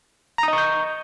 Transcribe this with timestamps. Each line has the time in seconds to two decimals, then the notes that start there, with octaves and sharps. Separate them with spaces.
0.38 A#5
0.43 D#6
0.48 D#5
0.53 C#6
0.58 G6